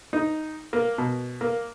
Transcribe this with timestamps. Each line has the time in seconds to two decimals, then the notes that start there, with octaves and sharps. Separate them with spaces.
0.13 D#4
0.73 A#3
0.98 B2
1.41 A#3